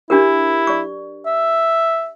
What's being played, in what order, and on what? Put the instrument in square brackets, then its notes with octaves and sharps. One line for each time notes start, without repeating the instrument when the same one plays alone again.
[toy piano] D4 G4 A#4 [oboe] E4
[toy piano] D5 C#6
[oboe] E5